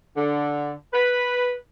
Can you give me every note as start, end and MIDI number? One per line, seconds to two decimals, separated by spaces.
0.16 0.72 50
0.92 1.51 71